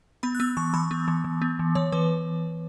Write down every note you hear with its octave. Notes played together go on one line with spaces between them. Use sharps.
B3 B5
F#6
B3 E6
E3 C#6
E3 B5
B3
E3
E3
B3
E3
E3 C#5
E3 B4